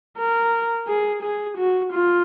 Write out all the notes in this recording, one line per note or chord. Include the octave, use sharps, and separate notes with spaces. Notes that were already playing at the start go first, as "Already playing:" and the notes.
A#4
G#4
G#4
F#4
F4